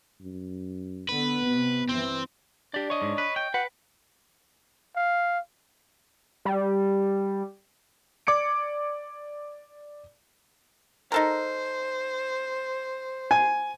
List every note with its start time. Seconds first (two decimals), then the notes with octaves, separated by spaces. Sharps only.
0.21 F#2
1.09 D3 B3 B4
1.47 C3 B3
1.89 G2 E3 C4
2.74 D4 G4 D5
2.90 C#5 D#5
3.02 G#2
3.18 B4
3.36 G5
3.54 B4 F#5
4.96 F5
6.45 G3
8.27 D5 D6 G#6 C#7 D7
11.12 D#4 A4 A#4 C5
13.31 G#5